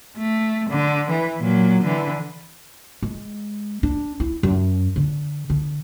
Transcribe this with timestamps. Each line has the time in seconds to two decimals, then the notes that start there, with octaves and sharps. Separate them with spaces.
0.17 A3
0.70 D3
1.10 E3
1.41 A#2 F#3
1.84 D3 E3
3.03 G#3
3.83 D4
4.20 E4
4.43 F#2
4.96 D3
5.50 D3